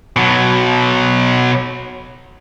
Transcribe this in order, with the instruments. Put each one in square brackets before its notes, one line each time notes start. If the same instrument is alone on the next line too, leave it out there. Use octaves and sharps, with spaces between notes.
[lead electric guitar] B2 F#3